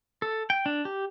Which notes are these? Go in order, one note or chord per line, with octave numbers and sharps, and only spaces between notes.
A4
G5
D4
G4